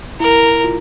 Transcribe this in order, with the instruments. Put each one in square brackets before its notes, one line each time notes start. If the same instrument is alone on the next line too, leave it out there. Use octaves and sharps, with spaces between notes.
[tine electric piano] E4 [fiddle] A#4
[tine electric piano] F4